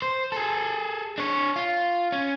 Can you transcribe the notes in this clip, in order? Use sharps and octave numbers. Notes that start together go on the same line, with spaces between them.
C5
G#4 A4
D4 C#5
F4
C#4